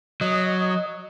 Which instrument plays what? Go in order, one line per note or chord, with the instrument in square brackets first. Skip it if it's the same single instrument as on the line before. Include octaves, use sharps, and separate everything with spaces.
[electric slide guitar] F#3 [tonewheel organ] D#5